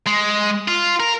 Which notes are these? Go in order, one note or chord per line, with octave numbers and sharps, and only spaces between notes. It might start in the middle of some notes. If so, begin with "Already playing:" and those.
G#3
F4
A#4